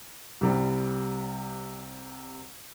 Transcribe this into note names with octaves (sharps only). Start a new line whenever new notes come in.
C2 C3 G3